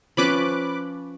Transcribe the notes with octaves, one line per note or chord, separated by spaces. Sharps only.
F3 C#4 B4 B5 D6 F#6